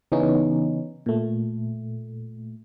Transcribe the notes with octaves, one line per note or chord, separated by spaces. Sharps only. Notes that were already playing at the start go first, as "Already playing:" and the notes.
C#3 E3 B3 C#4 D#4
A#2 A3